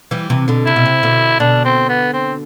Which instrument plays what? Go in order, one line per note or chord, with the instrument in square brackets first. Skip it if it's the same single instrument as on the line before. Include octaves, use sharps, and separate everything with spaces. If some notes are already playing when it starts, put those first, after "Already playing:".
[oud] E3 G3
C3 E3
B2 D3
[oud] C3 [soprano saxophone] E4
[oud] B2
C3
B2 D3
[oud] B2 D3 [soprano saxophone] D4
[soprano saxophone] C4
B3
C4